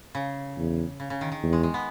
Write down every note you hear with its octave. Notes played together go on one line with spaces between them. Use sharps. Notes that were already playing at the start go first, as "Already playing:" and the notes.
C#3
E2
C#3
C#3
D#3
D#3
E2
G#3
G#3
B3